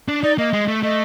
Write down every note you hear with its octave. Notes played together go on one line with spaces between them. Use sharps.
D4
D#4 D5
A#3 D#5
G#3
A3
A3 D#5